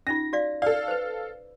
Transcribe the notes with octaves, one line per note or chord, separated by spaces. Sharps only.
C#4 D#4 F4 A#6
F#4 D5 F5
A4 D5 F5
B4 C5